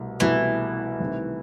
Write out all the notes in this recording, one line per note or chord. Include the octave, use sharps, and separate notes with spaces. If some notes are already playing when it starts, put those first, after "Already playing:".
Already playing: C2 B2 A3
C2 B2 E3 A3 E4
C2 C3 D#3 A3